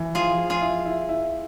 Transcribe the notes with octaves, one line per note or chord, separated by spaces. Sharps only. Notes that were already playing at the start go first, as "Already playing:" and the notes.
Already playing: E3
F3 F4 G#4
F3
F4 G#4
E4
E4
E4